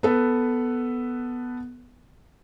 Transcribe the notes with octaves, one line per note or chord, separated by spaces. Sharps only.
B3 A4 B4